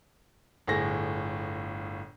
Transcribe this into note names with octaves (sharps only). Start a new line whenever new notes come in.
G1 A2 G#4 A#6